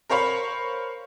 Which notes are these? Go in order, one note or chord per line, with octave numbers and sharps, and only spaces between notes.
A#4 C5 C#5 F5 B5